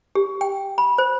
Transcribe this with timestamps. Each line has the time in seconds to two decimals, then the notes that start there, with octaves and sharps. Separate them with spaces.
0.15 G4
0.41 G5
0.78 B5
0.98 C5